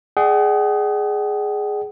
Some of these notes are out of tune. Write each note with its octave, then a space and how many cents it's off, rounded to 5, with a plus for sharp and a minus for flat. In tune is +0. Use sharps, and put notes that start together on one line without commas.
G#4 +5 D5 +35 F#5 +45